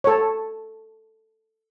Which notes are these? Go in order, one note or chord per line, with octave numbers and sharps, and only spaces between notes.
A4 C#5